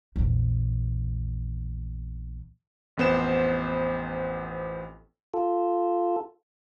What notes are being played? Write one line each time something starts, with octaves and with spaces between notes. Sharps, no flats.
A#1 E2
A1 F2 B3 C5 E7
F4 A4